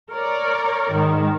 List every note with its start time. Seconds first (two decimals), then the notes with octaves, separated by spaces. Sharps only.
0.11 A#4 C#5 D5
0.92 G#2 D#3